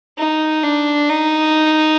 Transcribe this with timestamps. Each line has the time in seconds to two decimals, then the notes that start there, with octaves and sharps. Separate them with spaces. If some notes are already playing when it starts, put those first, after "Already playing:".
0.19 D#4
0.63 D4
1.09 D#4